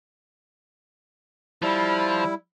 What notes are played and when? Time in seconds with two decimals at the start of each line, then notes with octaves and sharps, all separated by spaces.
1.63 F3 G3 E4